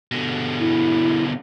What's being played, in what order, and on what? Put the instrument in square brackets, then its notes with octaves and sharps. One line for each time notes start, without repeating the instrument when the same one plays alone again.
[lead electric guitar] B2 D3
[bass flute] E4